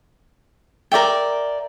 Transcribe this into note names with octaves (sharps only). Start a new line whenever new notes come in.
A#4 D5 E5 G5